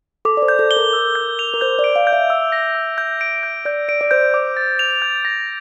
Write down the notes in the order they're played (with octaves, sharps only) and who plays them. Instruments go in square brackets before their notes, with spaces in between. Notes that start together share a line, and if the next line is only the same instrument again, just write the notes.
[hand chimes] A4 [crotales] D6
[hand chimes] D5
C5
[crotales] G6
[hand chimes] A4
[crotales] G7
[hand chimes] A#4
[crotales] E6
G6
F7
[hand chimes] A#4
[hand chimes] C5 [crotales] G6
[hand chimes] D5
[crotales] D7
[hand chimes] F5
[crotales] G6
[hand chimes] E5
[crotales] E6
A#6
E6
G6
D7
G6
[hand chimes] D5 [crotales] G6
[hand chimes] D5 [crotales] D7
[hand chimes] D5
[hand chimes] C5 [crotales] G6
[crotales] D6
A6
F7
G6
A#6